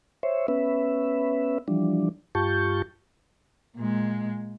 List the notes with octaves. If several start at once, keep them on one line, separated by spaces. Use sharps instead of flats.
C5 C#5 E5
B3 C#4 B4 E5
E3 F3 G3 D4
G2 F4 G4 A5 C#6 G6
A#2 G#3